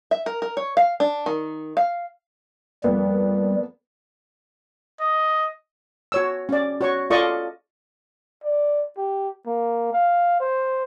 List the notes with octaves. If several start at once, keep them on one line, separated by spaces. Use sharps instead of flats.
E5
A#4
A#4
C#5
F5
D4
D#3
F5
F2 G3 A#3 B3
D#5
F#4 C#5 E6
C#4 D5
F#4 C#5 C#6
F4 A4 D5 D#5 C#6
D5
G4
A#3
F5
C5